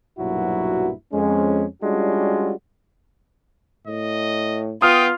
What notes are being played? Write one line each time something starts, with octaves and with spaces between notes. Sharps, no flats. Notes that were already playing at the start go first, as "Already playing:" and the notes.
B1 G2 A#2 F#3 E4 F#4
F2 G#3 C#4
G3 G#3 C#4 D4 F4 F#4
A2 D#5
B3 F4 G5 D#6 F6